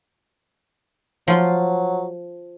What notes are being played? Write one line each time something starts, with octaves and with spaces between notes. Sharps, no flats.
F3 F#3 F4 C6